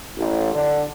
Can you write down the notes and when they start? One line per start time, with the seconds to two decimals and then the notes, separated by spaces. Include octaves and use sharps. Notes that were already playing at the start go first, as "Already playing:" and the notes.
0.17 A1
0.53 D3